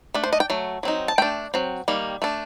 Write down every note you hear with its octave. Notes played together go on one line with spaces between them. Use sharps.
A3 D4
C5
D#5
G5
F#3 A3
F#3 C4 D#4
A5
A3 D4 G5
F#3 C4
D#3 G3 A#3
A3 D4